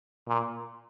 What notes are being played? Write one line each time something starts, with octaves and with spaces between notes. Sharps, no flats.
A#2